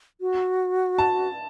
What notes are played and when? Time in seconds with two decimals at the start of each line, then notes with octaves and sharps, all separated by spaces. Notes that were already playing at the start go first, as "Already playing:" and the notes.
0.21 F#4
0.98 A5